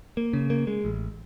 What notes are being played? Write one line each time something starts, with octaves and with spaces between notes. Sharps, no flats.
A#3
C#3
A#3
G#3
A1